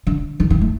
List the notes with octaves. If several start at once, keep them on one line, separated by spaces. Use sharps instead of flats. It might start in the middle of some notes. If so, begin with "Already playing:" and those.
D3
D#3
D#3
A3